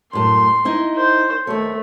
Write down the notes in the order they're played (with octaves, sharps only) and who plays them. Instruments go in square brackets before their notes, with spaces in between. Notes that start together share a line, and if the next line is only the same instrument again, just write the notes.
[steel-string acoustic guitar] F#2 A2 [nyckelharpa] C6
[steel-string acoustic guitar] D#4 E4 D#5
[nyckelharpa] C5
[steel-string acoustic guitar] D#2 C#5 [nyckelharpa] A3